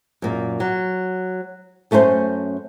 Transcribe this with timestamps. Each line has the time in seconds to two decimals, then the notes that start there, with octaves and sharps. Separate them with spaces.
0.22 F#2 A#2
0.60 F#3
1.91 F#2 A3 C#4 A4 C5